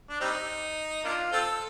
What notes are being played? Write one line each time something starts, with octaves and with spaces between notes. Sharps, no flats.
D4
G3 C4 D#4
A#3 D4 F4
C4 F4 A4